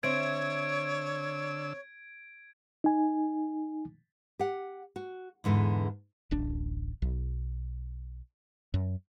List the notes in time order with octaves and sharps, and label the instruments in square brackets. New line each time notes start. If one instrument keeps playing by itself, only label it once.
[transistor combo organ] D3 E6 [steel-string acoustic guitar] C4 E5 [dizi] C#5 [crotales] G#6 D7
[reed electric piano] D#4 G#5
[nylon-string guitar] G4 F#5
F#4
E2 G#2 D3 E3
[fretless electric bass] D1 A1 D4
B1
F#2